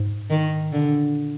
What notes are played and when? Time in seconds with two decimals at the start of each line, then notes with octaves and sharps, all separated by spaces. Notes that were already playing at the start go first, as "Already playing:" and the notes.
Already playing: G#2
0.30 D#3
0.72 A#2 D3
0.80 C3
0.88 A#2